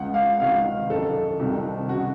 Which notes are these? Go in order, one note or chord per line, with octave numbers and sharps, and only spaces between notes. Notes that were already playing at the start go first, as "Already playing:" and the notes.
Already playing: C#2 C#3 F#5
F5
C#2 C3 D#3 F5
F#2 D#3 A4
C2 C3 D#3
C#3 F#4